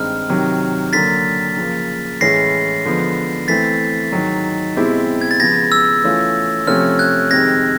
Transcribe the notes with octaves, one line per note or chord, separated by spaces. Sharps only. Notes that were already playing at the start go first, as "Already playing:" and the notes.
Already playing: G2 D#3 G#3 C4 D#4 F6
C3 D#3 F#3
D3 F#3 A#3 A6 B6
C#3 F3 A#3
A2 E3 G#3 C#4 E4 A#6 C7
D3 F3 G#3 B3
E3 A3 C4 E4 A6 B6
G#2 D#3 F#3
B2 G#3 C4 E4 G4
G#6
A6
C#3 F3 G#3 B3 G#6 A#6
E6
E3 A3 C#4 F4
C3 F3 A3 C#4 F6
F#6 G#6
F2 C3 D#3 G#3 G#6 A#6